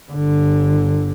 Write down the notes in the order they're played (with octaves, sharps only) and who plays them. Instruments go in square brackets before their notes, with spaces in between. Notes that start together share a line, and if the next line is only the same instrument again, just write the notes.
[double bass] G1 D3